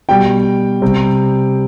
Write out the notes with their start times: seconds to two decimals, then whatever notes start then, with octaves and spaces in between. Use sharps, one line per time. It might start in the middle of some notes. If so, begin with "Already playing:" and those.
0.09 B2 G3 G5
0.82 C3 G3